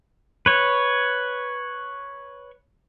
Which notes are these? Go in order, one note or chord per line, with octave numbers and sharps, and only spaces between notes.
B4 C#5